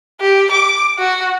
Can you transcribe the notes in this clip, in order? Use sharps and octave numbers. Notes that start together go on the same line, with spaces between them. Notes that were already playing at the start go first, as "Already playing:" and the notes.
G4
D6
F#4